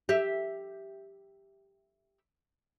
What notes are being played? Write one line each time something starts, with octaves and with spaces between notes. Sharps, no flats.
G4 E5